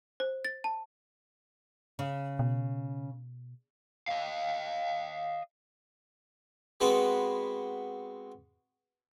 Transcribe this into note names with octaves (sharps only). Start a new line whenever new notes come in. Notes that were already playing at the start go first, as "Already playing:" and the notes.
C5
A6
A5
C#3
B2
D#5 F5
G#3 B3 C4 F#4 B4